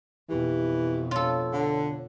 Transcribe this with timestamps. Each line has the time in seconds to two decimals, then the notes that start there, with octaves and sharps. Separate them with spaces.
0.29 F2 B2 E3 G4
1.11 F4 A4 C#5
1.52 D3